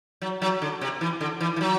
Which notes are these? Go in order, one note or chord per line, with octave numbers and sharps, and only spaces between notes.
F#3
F#3
D3
C3
E3
D3
E3
E3
F#3